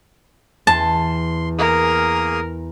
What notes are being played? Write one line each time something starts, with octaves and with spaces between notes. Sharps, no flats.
E2 A5 C6
A#3 G#4 A#4 D#6